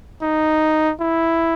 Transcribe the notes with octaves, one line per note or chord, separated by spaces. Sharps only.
D#4
E4